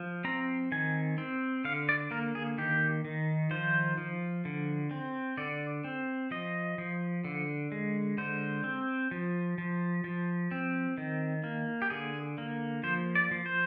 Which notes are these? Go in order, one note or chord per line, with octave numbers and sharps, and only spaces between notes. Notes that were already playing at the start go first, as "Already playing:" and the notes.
Already playing: F3
C4 A#5
D#3 G#5
C4
D3 F5
D5
A#3 A#4
G#4
D#3 G4
D#3
F3 C5
F3
D3
C4
D3 D5
C4
F3 D#5
F3
D3
G#3
D3 C5
C4
F3
F3
F3
C4
D#3
A#3
G4
D3 G#4
A#3
F3 C5
D5
F3
C5